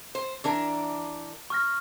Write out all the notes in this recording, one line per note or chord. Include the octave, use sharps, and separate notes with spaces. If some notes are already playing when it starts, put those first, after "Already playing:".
C5
E3 D4 A#4
C#6 F6 A#6